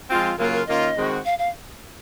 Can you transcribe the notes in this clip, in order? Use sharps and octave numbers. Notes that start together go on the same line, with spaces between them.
F3 G#3 C4 F4
C#3 F#3 A#3 F4 A#4
A#4
D#3 A#3 C#4 F4 D#5
D#3 G#3 C4 F#4
F5
F5